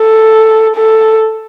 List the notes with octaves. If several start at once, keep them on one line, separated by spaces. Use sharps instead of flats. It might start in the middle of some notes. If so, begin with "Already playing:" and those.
Already playing: A4
A4